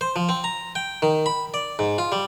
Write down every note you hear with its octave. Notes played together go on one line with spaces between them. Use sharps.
C5
F3
C4
A#5
G5
D#3
B5
D5
G#2
F4
G3